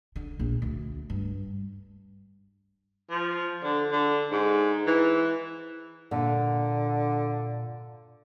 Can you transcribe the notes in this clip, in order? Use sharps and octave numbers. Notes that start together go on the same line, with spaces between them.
D3
A#1
D2
G2
F3
D3
D3
G#2
E3
A#2 D3